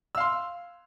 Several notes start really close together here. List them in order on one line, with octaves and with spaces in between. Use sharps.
E6 F5 C6